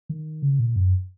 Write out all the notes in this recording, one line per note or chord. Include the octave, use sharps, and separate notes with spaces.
D#3
C#3
A#2
F#2